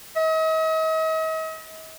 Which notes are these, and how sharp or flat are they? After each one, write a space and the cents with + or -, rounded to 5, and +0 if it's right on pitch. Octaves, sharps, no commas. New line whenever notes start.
D#5 +45